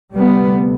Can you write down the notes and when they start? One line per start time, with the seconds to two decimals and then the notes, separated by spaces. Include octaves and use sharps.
0.15 D2 C3 G3 B3